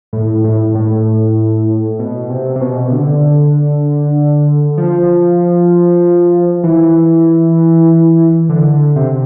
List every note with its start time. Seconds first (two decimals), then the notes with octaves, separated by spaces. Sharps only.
0.13 A2
0.44 A2
0.75 A2
1.99 B2
2.30 C3
2.56 C3
2.61 B2
2.88 C3
2.92 D3
4.78 F3
6.64 E3
8.49 D3
8.96 C3